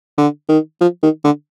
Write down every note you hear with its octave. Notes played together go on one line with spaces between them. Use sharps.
D3
D#3
F3
D#3
D3